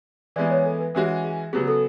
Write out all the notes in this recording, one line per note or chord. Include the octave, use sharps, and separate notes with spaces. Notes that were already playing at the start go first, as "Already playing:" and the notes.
E3 G#3 B3 D5
C#5
A4
B4
E3 G#3 C#4 F#4
G#4
C#3 F#3 B3 G#4
A4